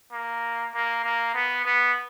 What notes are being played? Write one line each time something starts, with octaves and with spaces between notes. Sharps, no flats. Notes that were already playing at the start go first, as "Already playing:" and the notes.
A#3
A#3
A#3
B3
B3